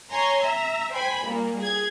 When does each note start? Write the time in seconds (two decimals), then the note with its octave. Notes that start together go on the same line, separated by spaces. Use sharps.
0.12 C#5 G#5 A#5 C6
0.44 E5 A#5
0.92 C5 G5 G#5 B5
1.23 A#2 G3 A#3
1.59 G#4 G#6